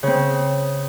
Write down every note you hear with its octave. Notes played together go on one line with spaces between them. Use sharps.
C#3 C4